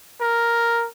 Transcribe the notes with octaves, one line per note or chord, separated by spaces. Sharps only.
A#4